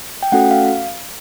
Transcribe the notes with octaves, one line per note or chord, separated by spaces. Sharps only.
G5
A3 C#4 F#4 A4 F#5
F5